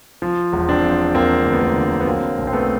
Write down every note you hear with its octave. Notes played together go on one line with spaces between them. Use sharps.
F3
E1
C4 D4
F3
E1 A#3 C4
D2
B3
A#3
D3
B3
F#3 A#3 C4
B1
C4
A3 B3